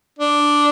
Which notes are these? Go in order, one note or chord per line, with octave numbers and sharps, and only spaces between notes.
D4